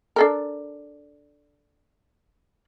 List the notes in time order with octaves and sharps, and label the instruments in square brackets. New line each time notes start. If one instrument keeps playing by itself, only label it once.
[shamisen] D4 A4 A#4